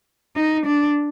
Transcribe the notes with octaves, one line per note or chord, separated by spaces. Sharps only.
D#4
D4